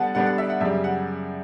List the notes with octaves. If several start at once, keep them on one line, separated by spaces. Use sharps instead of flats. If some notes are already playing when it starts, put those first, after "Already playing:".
Already playing: D3 G3 B3 D4 F#5 A5
D3 G3 B3 D4 F#5
F#5
E5
F#5
F#2 C#3 G3 E5
F#5